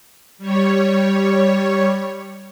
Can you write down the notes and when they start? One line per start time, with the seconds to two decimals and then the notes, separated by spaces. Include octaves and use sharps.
0.38 G3 C#5